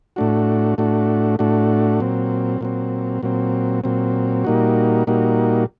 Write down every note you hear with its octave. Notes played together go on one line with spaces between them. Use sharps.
A2 A3 D4 F#4
A2 A3 D4 F#4
A2 A3 D4 F#4
A#2 F#3 C4
A#2 F#3 C4
A#2 F#3 C4
A#2 F#3 C4
A#2 G3 A#3 D#4 F#4
A#2 G3 A#3 D#4 F#4